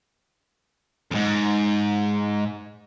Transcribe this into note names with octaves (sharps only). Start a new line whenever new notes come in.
F2 G#2